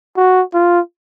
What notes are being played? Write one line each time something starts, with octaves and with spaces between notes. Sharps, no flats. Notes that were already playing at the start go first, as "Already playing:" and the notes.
F#4
F4